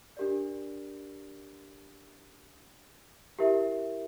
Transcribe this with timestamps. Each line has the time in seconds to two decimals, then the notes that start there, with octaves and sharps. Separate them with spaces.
0.17 D4 G4 A#4 D5
3.39 E4 G4 A#4 E5